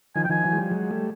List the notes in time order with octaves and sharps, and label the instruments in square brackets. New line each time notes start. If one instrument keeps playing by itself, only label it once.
[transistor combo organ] D#3 F3 [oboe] G#5
[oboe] G5
[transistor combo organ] D#3 F3 [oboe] G#5
[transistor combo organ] E3 F#3
G#3
F3 G3
F#3 G#3
G3 A3